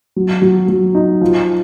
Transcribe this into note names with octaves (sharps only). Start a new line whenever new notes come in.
F#3
F#3
F#3
D#4
F3